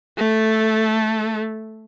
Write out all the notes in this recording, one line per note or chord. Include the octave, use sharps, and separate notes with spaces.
A3 A4